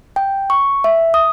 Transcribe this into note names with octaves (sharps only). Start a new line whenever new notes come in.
G5
C#6
E5
D#6